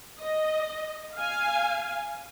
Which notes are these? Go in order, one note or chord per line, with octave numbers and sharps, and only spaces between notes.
D#5
F5 G#5